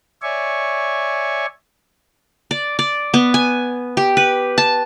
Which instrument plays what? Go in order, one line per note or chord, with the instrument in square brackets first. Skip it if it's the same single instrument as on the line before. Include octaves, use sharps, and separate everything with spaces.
[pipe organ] C#5 D5 E5 G#5 C#6
[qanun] D5
D5
B3
G#5
G4
B4
A5